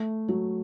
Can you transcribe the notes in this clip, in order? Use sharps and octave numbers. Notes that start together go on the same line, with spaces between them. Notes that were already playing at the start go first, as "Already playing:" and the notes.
Already playing: A3
F#3